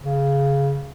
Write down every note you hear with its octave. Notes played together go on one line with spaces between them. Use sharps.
C#3